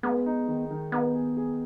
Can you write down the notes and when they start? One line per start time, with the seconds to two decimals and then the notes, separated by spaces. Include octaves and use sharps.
0.03 G#3 B3
0.26 D#4
0.48 D#3
0.71 D#3
0.92 B3 D#4
1.14 G#4
1.37 G#4